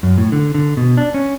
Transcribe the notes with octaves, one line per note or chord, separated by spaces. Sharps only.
F#2
A2
D3
D3
B2
D4
C#4